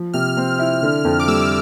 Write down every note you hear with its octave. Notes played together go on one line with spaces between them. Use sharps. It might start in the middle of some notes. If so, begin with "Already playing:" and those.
Already playing: F3
C3 F6
C4
E4
D3
F2
D6
G3 E6